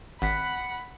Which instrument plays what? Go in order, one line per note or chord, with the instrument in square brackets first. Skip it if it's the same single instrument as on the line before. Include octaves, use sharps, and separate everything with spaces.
[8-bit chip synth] G#1 B6 [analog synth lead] F#5 [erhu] B5